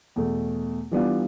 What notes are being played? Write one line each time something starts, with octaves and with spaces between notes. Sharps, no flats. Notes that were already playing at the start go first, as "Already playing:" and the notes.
E2 B2 A3
E3 G3 B3 D4 F4